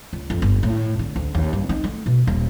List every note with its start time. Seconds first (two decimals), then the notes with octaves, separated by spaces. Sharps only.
0.13 C#2
0.30 F2
0.42 G1
0.63 A2
0.99 D3
1.16 D2
1.35 D#2
1.53 G2
1.69 D#4
1.84 A3
2.06 B2
2.27 D#1